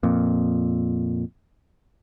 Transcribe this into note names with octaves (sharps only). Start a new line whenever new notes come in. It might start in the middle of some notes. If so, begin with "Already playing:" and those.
F2 A#2